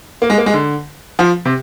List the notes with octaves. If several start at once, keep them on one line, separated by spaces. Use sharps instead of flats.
A#3
G#3
A#3
G#3
D3
F3
C3